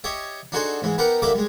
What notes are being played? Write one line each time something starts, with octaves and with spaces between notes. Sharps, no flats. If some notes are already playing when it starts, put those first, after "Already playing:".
G4 C#5 D#5 E5
D4 D#4 F#4 G#4 A4 C5
G#2 E3 G#3
B3 D#4 G4 A#4 F#5 A#5
D3 G3 A#3 E5 B5 D6
G3 G#3